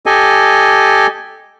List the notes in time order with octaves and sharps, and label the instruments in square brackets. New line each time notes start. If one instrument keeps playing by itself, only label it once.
[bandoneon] G4 A4 D#5 G#5